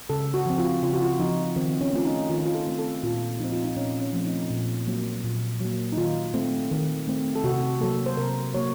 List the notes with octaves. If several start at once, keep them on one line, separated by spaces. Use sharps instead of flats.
C#3 A4
F#4
F3 C4
F4
C#3 F4
F#4
F4
F3 C4 D#4
D#3 C4
C#4
A3 C4 F4
D#4
D#3 F4
D#4
F4
A4
A3 C4
A4
A#2 F4
F3 A3 C4 D#4
F4
D#4
A#2 C#4
C#4
F3 A3 C4
D#4
A#2
F#3 A#3
A#2
F#3 A#3
D#4
D#3 F4
A3 C4
D#3
A3 C4
A4
C3 F#4
F#3 A#3 A4
C5
C3 A#4
F#3 A#3 C#5